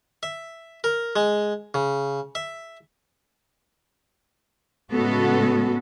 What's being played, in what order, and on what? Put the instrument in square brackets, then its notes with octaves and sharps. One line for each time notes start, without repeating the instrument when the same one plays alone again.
[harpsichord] E5
A#4
G#3
C#3
E5
[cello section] A2 C#3 G#3 B3 F#4 A4